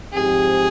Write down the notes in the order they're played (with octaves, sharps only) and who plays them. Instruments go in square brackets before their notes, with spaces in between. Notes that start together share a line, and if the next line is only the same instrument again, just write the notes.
[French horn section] G#2 F3 C4 G4 [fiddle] G#4